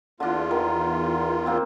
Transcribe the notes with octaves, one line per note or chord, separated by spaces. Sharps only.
E2 D3 D4 F4
D#3
A#3 C4